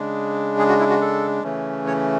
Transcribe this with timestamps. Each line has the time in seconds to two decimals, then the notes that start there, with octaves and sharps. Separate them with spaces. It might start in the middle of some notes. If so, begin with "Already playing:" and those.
Already playing: C#3 G#3 D4
0.59 G#4
0.69 F#4
0.80 E4
0.90 F#4
1.01 A4
1.43 C#3 E3 A3 C#4
1.87 C#5